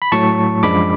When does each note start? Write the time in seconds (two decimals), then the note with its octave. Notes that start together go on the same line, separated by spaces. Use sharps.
0.02 B5
0.12 A2 F#3 A3 A5 C#6
0.63 F#2 F3 G#3 D4 B5 D6